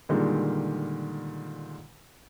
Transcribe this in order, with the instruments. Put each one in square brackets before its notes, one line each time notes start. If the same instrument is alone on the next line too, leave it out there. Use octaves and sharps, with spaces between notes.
[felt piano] A#2 D3 D#3 G3 G#3